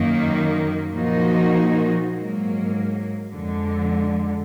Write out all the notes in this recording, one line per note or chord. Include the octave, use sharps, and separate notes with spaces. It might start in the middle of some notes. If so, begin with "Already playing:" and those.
Already playing: F#2 D#3 A#3
A#2 F3 A#3 D#4 F#4
G#2 F#3 A#3
F2 D3 G#3